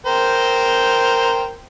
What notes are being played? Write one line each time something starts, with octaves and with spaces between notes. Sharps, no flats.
A#4 C5 G5